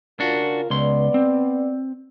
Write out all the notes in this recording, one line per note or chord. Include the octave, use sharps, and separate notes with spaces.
C#3 D4 F4 F#4 A#4
C#2 B3 D5 C6
C4